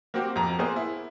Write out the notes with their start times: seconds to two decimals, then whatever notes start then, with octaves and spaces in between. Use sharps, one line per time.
0.14 A#3 C4 F#4 G4
0.36 F2 A#5
0.59 A#3 B3 G#4 C5
0.76 E4